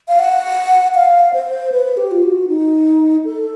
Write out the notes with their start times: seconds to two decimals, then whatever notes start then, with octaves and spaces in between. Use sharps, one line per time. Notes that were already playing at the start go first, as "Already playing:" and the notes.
0.08 F5
0.19 F#5
0.95 F5
1.34 C5
1.72 B4
1.97 G4
2.11 F4
2.23 F#4
2.48 D#4
3.25 A4